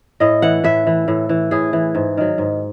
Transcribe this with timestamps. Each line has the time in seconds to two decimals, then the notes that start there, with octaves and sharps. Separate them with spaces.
0.20 A2 D#5
0.42 E3 F#5
0.64 A2 E5
0.87 E3
1.08 A2
1.29 E3
1.51 A2 G#4
1.73 E3
1.95 G#2
2.17 D#3 F#3
2.38 G#2